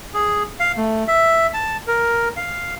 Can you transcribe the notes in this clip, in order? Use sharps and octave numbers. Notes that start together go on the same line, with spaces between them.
G#4
F5
A3
E5
A5
A#4
F5